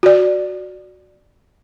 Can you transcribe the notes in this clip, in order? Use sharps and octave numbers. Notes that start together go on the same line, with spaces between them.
F#4 D5